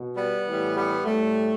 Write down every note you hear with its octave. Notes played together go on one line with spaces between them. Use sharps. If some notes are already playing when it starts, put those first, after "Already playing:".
Already playing: B2
G3 B3
A2 E3 G3
G3 B3
A2 G3 A3